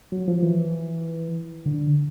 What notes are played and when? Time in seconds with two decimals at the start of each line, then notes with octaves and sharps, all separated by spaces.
0.12 F#3
0.27 F3
0.42 E3
1.66 D3